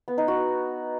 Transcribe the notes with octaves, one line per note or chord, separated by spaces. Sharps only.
B3
D#4
F#4